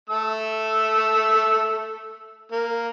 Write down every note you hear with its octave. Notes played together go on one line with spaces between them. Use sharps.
A3 E6
A#3